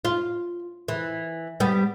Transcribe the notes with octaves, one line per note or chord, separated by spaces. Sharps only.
F4
E3
G3 B3